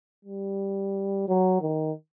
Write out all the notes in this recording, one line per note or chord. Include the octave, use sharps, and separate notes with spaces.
G3
F#3
D#3